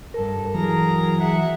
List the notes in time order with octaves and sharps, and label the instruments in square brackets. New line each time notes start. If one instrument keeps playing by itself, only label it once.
[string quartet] G2 A4 [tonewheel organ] A#4
[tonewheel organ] E3 F#3 [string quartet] G#4 A#4 A#5
[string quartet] G#4 E5 F#5